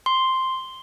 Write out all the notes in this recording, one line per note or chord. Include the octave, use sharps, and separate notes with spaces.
C6